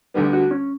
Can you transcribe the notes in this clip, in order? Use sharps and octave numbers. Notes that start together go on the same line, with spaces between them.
D2 D3 G3 B3
F#4
C#4